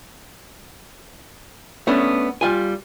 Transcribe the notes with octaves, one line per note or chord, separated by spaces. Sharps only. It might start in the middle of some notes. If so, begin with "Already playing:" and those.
A3 B3 C#4 D4
G3 F4 G#5